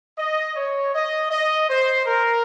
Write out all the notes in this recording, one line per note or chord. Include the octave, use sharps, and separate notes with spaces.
D#5
C#5
D#5
D#5
C5
A#4